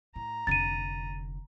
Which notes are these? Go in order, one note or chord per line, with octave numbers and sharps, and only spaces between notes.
A2 A#5
F1 D3 A6 D#7